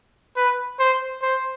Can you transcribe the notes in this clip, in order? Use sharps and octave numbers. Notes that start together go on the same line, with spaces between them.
B4
C5
C5